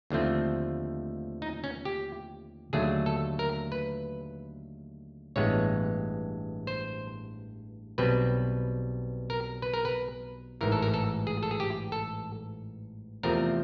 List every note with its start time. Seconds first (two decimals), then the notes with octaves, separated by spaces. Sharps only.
0.10 D#2 D3 F3 A3 C4
1.42 D#4
1.64 C#4
1.85 G4
2.73 D#2 D3 F#3 A3 G#4
3.06 A4
3.39 A#4
3.72 B4
5.36 A1 G2 E3 G#3 B3 C#5
6.67 C5
7.98 B1 B2 G3 C4 B4
9.30 A#4
9.62 B4
9.74 A#4
9.85 B4
10.61 A1 G#2 E3 A#4
10.72 A4
10.83 A#4
10.94 A4
11.27 G#4
11.43 A4
11.51 G#4
11.60 G4
11.92 A4
13.23 E2 C3 F3 A3 C4 A#4